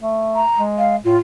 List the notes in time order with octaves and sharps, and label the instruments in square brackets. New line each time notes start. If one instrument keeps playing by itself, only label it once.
[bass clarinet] A3
[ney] A#5
[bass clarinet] G#3
[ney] F5
[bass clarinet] A2 [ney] F4